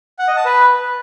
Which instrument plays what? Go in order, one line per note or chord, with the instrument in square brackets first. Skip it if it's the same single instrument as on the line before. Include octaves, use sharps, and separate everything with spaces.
[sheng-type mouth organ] F#5
D#5
A5
B4